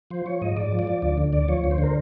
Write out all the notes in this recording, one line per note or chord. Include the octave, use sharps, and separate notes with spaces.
F3 C5
F3 C#5
G#2 D#5
G#2 D5
F3
D5
F3
D2 D5
D3
D2 D5
F3 C#5
D2
C5
D3
A#4